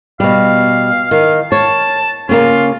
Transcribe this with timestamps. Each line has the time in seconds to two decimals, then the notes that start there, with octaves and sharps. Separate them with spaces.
0.20 B2 G3 F5
1.11 D#3 F5
1.52 C#5 A5
2.29 C#3 A#3 C#4 F4